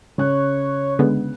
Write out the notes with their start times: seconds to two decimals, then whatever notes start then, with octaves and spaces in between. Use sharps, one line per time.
0.18 C#3 C#5 F#6
0.99 D3 G#3 B3